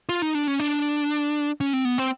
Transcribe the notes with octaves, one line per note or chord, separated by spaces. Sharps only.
F4
D#4
D4
C#4
D4
C#4
C4
B3
C4